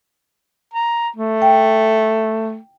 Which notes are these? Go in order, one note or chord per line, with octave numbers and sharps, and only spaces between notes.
A#5
A3
G5